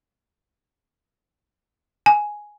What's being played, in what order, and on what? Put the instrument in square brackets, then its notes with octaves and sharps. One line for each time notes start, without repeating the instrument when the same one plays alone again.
[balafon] G#5